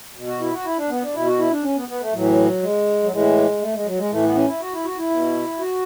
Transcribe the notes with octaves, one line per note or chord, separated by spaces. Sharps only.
B2
F#4
E4
F#4
E4
D4
B3
D4
B2 E4
F#4
E4
D4
C#4
B3
B3
A3
A2 E3 F#3
G#3
F#3
A2 E3 G#3
A3
G#3
F#3
G#3
A2 E3 A3
B3
C#4
E4
F#4
E4
F#4
E4
B2
F#4